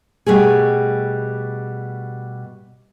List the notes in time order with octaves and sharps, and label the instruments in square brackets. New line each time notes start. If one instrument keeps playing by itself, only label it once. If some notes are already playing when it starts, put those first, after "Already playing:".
[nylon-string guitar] B2 G3 A3 G#4